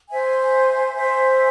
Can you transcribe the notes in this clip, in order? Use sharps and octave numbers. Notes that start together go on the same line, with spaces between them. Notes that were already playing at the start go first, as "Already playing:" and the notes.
C5 E5 G#5
C5 E5 G#5